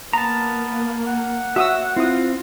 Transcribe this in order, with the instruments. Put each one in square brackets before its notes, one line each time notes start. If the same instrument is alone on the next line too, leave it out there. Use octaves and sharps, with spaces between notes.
[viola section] A#3 [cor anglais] B3 [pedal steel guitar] A5 A#5
[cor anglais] F#5
[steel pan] F#4 D#6 E6 [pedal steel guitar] E5
[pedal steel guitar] C4 [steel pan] E4 D#6 [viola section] F4